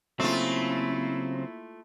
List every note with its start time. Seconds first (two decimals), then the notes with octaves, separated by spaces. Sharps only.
0.20 C#3 F#3 A3 A#3 C4 E4 F4